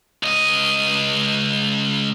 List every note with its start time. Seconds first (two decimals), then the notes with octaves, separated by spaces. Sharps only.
0.23 C#2 D#5